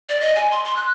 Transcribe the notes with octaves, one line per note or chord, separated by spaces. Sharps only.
D5
D#5
G#5
C6
C6
F#6